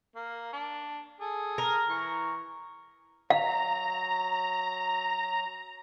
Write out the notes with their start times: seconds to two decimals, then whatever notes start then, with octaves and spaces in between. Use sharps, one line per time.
0.16 A#3
0.53 D4
1.20 G#4 A4
1.58 A#4
1.89 E3 C#6
3.30 F#3 F5 A#5